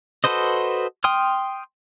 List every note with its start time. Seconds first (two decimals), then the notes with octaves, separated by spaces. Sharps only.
0.24 F#4 A4 B4 C5 D#5
1.04 G5 C6 D#6 F6